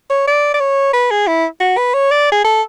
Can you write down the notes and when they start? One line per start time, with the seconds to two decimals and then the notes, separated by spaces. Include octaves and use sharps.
0.10 C#5
0.27 D5
0.54 D5
0.60 C#5
0.93 B4
1.11 G#4
1.27 E4
1.60 F#4
1.77 B4
1.94 C#5
2.11 D5
2.32 G#4
2.44 A4